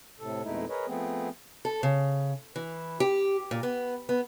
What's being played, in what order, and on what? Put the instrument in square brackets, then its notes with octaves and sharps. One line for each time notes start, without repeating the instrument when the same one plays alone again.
[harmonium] A2 C3 A4
F2 B2 G#3 A3 D#4 E4
G#4 A#4 B4 C#5 D#5
F3 A3 B3 C4 G#4
[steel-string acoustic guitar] A4
C#3
E3
G4
A#2
B3
B3